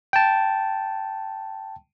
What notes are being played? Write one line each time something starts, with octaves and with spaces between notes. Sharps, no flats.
G5 A5